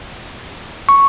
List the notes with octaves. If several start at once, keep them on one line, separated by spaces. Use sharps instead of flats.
C#6